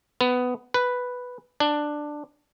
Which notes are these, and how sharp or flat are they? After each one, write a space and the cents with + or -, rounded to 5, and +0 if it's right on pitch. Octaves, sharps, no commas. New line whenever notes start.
B3 +15
B4 +0
D4 +10